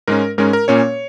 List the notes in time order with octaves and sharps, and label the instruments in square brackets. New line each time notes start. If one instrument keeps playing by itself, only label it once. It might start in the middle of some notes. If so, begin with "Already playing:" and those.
[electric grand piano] G#2 G#3 C#4 A#4
G#2 G#3 C#4 A#4
A#4
A#2 A#3 C#4 C#5